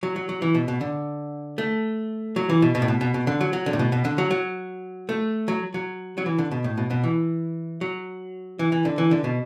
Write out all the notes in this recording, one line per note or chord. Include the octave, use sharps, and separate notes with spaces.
F#3
F#3
F#3
E3
B2
B2
D3
A3
F#3
E3
B2
B2
A2
B2
B2
B2
D3
F#3
F#3
D3
A2
B2
B2
D3
F#3
F#3
A3
F#3
F#3
F#3
E3
D3
B2
A2
B2
B2
E3
F#3
E3
E3
D3
E3
D3
B2